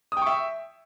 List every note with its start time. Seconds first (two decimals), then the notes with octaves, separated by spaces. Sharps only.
0.12 D#6
0.17 G5
0.22 C#6
0.27 E5